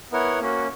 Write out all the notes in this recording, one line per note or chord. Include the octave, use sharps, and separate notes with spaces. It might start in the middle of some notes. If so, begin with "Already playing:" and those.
B3 E4 A#4 C#5 F#5
A#3 C#4 F#4